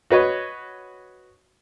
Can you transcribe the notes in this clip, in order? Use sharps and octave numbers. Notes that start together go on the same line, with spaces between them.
F#4 B4 C#5 D#5